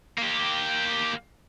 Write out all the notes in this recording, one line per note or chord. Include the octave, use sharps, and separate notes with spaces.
A#3 G4